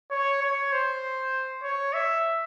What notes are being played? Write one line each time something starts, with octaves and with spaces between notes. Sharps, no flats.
C#5
C#5
C5
C#5
E5